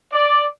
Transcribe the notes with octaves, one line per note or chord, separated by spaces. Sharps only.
D5